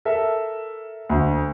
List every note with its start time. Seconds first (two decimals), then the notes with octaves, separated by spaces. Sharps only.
0.05 A4 A#4 E5
1.09 D2